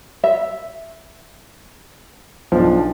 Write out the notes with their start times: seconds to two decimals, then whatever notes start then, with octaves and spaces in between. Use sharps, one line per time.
0.24 E5
2.52 B1 F3 D4